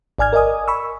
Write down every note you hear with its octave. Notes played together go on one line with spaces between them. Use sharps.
G#1 D5 G#5 F6 G#6
A#4 D5 D#5 G#5 D#6
B5 C#6 E6